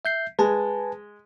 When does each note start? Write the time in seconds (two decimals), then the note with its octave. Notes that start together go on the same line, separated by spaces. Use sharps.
0.05 E5 G6 C7
0.39 G#3 B4 G#5 A5